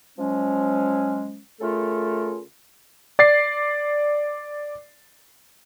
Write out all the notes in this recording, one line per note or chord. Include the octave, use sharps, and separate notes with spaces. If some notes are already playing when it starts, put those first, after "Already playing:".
F3 F#3 G#3 C#4
C#3 A3 F4 A4 A#4
D5 A6 C7